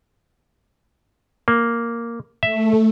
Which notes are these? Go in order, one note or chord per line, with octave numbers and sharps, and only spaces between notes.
A#3
A3 E5